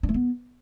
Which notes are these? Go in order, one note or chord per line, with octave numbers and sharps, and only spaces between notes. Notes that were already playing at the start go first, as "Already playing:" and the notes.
D4
A3
B3